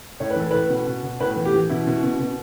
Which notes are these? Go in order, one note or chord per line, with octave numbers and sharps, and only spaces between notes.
A2 C#5
B4
E3 A4
A2 B4
B2
B2
B2
A2 B4
E3
G4
E3
B2 E4
B2
B2
B2